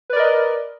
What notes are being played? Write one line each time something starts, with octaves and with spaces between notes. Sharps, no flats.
A#4 B4 D5 D#5